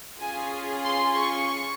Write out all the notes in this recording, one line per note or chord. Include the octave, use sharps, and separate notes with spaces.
C#4 F4 G#4 G#5
C6
C#6